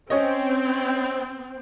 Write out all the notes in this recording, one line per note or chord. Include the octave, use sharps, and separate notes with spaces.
C4 C#4 C#5 D#5